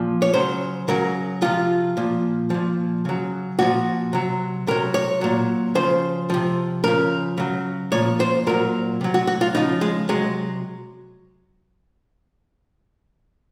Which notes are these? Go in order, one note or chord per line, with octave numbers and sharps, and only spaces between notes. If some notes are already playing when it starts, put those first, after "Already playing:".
Already playing: A#2 F3
C#5
C#3 F#3 C5
C#3 F#3 A#4
C3 F3 F4
A#2 F3
A#2 F3
C#3 F#3
A#2 F3 F#4
C3 F#3
C3 F#3 A#4
C#5
A#2 F#3
C#3 F3 C5
C3 F3
C#3 F3 A#4
C#3 F#3
A#2 F3 C#5
C5
A#2 F#3 A#4
C3 F#3
F#4
F#4
F4
C#3 F3 D#4
G#3
C3 F#3 G#3